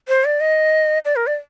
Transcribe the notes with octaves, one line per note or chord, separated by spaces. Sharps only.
C5
D5
D#5
D5
A#4
D5